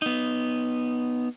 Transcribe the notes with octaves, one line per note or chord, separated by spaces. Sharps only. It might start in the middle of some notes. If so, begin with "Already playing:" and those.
B3 D#4